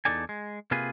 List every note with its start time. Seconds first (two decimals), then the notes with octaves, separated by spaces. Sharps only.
0.05 E2 A#2 D#4 A4 D5 G#5
0.29 G#3
0.71 C3 A#3 F4 G#4 B4